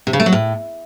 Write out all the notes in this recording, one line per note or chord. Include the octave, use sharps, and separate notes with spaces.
C3
C#3
A3
F#3
A2